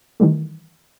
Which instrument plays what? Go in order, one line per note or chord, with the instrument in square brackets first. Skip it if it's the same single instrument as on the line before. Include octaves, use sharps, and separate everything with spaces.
[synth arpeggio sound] D#3 E3 G3 A3